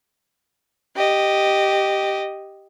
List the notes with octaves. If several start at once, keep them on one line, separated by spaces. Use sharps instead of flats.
G4 D#5